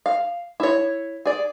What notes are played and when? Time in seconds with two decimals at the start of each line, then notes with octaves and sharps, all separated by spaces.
0.06 F5
0.60 E4 C#5
1.26 G#4 D5